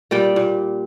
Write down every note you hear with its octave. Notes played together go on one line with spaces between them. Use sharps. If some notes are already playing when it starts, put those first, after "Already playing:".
A#2 G3 D5 G5
A#2